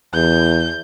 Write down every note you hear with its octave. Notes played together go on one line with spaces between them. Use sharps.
E2 G6